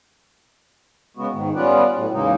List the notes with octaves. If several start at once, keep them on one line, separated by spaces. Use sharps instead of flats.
C#3 G#3 B3 F#4
G#2 D#3
G3 B3 C#4 F4 B4 D5
A2 F#3
E2 C#3 G#3 A#3 D#4